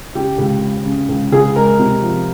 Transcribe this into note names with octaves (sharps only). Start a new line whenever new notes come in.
C#3 G4
C#2
C#3
C#3
C#2
C#2 G#4
G#3 A#4
C3
F3